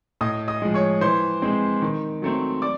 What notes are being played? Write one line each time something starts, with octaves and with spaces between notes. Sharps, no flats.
A2 D#5 D#6
D#5 D#6
F3 G#3
C#5 C#6
E3 C5 C6
G#3 C4
D#3
F#3 A3 C4
D5 D6